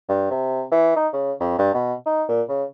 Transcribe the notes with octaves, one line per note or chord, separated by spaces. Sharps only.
G2
C3
E3
D#4
C#3
F2
G2
B2
D#4
A#2
C#3